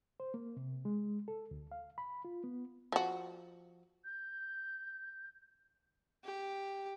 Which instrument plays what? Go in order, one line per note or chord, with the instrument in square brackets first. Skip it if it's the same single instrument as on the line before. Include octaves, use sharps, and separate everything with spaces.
[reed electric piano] C5
A#3
C3
G#3
A4
D2
F5
B5
F4
B3
[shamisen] F3 F#4
[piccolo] G6
[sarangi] G4